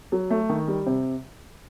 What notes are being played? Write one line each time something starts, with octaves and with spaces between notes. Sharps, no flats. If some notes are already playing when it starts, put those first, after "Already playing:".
F#3
A3
D#3
G3
C3